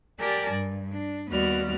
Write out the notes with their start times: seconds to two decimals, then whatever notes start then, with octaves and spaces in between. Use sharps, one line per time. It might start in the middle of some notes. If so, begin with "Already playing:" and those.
0.20 G4 A#4 D5 G#5 A5
0.51 G2
0.92 D4
1.29 D#2 G3 B3 F#4 D5 F6